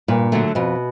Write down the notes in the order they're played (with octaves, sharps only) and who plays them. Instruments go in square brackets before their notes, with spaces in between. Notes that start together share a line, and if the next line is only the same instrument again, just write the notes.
[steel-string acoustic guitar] G2 [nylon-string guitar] A#2
[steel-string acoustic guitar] D3 F#3 A3
[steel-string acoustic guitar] F2 [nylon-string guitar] B2